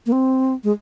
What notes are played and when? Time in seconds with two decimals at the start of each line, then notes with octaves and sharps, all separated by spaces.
0.06 A#3
0.12 C4
0.64 G#3